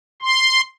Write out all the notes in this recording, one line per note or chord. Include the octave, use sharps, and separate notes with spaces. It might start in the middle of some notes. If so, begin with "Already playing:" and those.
C6